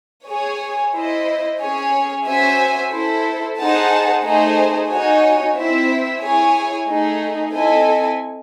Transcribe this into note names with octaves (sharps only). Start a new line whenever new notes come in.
G#4 C#5 G#5
E4 C5 D#5
C#4 G#4 C#5 G#5
C#4 F#4 C5 E5 G#5
E4 A4 C5
D#4 G#4 C5 F#5 A5
A3 D#4 G#4 C5
D#4 F#4 C#5 G#5
C4 E4 C5 E5
E4 G#4 C#5 G#5
A3 D#4 G#4
C4 E4 A4 D#5 G#5